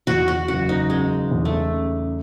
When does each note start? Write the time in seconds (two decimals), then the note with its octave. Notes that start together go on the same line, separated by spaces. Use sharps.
0.07 E2 F#4
0.28 F#4
0.48 F#1 F#4
0.69 D#4
0.90 C#3 G#3
1.31 E2
1.45 A3
1.73 C#3